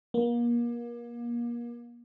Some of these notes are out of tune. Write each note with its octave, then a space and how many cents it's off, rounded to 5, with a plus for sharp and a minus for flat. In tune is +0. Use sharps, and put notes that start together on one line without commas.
A#3 +35